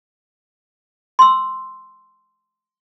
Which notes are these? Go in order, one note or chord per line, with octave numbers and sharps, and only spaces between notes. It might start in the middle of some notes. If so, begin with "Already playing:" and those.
C6 E6